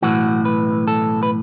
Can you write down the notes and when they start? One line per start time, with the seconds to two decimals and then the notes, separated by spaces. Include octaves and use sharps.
0.02 B1 A2 E3 F#4
0.45 B4
0.87 A4
1.23 B4